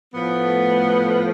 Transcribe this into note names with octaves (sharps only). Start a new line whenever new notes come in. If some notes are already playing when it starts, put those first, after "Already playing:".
A2 F3 A3 B3